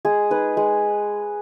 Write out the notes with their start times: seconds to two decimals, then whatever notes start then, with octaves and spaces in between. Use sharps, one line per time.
0.05 G#3 G#4
0.31 D#4 B4
0.57 G#3